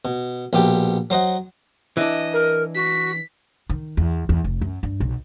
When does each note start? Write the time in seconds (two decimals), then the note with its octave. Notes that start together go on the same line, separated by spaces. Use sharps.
0.05 B2
0.53 A#1 B2 G4 G5
1.10 F#3 C5 D#5 F#5
1.97 E3 D4 D#5
2.33 A#4
2.75 F#4 B6
3.70 D#3
3.97 E2
4.29 E2
4.44 F1
4.61 F#2
4.83 G2
5.00 B1